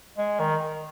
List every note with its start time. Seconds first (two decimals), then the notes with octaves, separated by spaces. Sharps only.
0.18 G#3
0.40 D#3